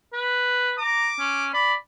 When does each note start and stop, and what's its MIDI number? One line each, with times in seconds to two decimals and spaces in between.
0.13 0.74 71
0.79 1.09 82
0.79 1.47 86
1.19 1.50 61
1.54 1.74 74
1.54 1.76 83